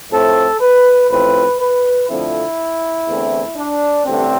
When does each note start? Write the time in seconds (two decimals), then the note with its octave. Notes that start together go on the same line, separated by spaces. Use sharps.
0.11 A2 F3 A3 C4 A4
0.61 B4
1.10 A1 A2 F3 C4 B4
1.60 B4
2.09 F2 D3 F3 A3 C4 E4
3.08 E2 D3 A3 C4
3.57 D4
4.06 A1 G2 D3 A3 C4